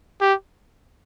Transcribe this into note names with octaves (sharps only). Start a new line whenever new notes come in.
G4